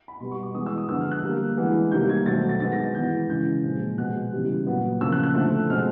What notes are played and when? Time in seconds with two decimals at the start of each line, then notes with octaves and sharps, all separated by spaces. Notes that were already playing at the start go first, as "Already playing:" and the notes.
0.08 B5
0.20 B2 G3 B3 C6
0.31 C#6
0.43 D6
0.54 E3 G#3 B3 D#6
0.66 E6
0.78 D#6
0.89 D3 F3 G#3 B3 E6
1.01 F6
1.11 F#6
1.23 D3 G3 A#3
1.57 E3 G#3 B3
1.91 C3 D#3 G3 A#3 G6
2.09 G#6
2.26 B2 F#3 A3 C4 A6
2.49 A6
2.60 D#3 G#3 B3 A6
2.72 A#6
2.84 A6
2.95 E3 G#3 B3 G6
3.29 C#3 E3 G#3 G6
3.64 A#2 F3 G#3 C4
3.97 B2 G#3 B3 F#6
4.33 C#3 E3 G3
4.67 A#2 F#3 B3
5.00 C#3 F3 A#3 E6
5.12 F#6
5.23 F#6
5.35 D3 F3 A3 C4
5.69 B2 G#3 C4 F6